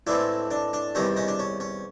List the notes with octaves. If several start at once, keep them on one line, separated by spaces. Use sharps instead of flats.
A2 E3 G#3 C4 D4 E4
D4
D4
E2 C3 D#3 G3 C#4 D#4
C#4 D#4
D4
C#4
C#4